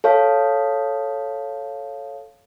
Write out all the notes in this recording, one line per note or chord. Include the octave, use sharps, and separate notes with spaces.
A4 C#5 F5